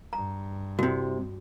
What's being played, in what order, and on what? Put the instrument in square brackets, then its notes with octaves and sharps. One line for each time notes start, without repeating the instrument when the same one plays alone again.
[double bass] G2 [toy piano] A#5
[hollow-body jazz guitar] C2 C3 [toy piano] F#4